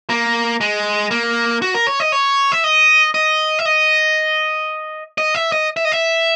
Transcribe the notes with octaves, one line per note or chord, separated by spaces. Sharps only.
A#3
G#3
A#3
F#4
A#4
C#5
D#5
C#5
E5
D#5
D#5
E5
D#5
D#5
E5
D#5
E5
D#5
E5